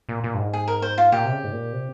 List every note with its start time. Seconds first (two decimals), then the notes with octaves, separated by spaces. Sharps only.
0.09 A#2
0.24 A#2
0.34 G2
0.39 G#2
0.53 G#4
0.68 A#4
0.82 C5
0.98 F4
1.12 A#2 G4
1.25 C3
1.32 C#3
1.44 G#2
1.52 A#2
1.73 C3